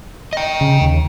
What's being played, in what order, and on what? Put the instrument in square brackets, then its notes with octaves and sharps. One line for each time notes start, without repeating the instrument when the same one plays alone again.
[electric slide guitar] D#5 G5
[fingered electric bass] C#3
D#2